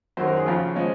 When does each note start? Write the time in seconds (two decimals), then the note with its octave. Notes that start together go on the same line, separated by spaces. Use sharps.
0.17 F#2 D#3 F#3 C5
0.27 A#4
0.37 G#4
0.46 F2 C#3 F3 F4
0.76 F3 G#3 C#4